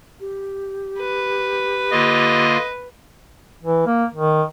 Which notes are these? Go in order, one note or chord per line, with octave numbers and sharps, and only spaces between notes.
G4
B4
D3 A#3 F4 D#5
E3
A#3
D#3